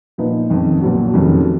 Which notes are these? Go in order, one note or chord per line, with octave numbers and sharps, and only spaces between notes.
A#2 F3 B3 D#4
F#1 F2 D#3
B1 A#2 F#3 B3 F#4
F1 F2 D#3 F#3 C#4